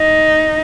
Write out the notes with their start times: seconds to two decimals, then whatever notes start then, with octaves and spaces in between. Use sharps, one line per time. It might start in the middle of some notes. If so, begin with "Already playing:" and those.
Already playing: D#4